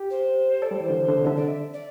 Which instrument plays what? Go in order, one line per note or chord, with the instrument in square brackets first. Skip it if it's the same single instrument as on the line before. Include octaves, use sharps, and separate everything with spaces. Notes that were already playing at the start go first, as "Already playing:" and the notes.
Already playing: [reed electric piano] G4
[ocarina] C5
[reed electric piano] A4 [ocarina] D5
[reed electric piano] G3
[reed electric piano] E3 [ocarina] C5
[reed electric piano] D3
D3
C3
[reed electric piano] D3 [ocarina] E5
[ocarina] D5
E5
D5